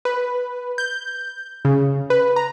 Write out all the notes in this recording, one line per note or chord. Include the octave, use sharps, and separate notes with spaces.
B4
G6
C#3
B4
A#5